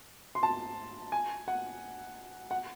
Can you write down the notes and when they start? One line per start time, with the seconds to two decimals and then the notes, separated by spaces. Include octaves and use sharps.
0.35 C6
0.43 A5
1.12 G#5
1.48 F#5
2.51 F#5